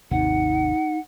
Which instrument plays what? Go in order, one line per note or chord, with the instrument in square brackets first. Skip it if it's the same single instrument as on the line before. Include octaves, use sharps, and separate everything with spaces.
[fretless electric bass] G#1 D#2 C3 [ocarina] D#4 [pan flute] F#5